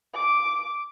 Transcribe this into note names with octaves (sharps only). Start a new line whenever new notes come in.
D6